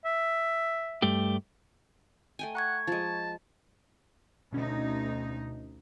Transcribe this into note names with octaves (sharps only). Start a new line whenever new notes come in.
E5
G2 A3 G4
A3 G5 G#5
F#5 A#5 C#6 G#6
F3 G#3 A5
D2 B2 C#4 D#4